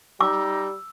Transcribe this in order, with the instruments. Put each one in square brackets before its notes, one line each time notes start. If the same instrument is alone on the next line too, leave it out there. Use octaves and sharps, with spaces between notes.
[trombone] G3 [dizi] D#4 [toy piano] D6 [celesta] E6